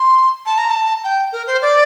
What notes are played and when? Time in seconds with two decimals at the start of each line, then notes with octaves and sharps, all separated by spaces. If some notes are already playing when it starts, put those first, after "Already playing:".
Already playing: C6
0.46 A5
0.58 A#5
0.70 A5
1.04 G5
1.33 A#4
1.47 C5
1.62 D5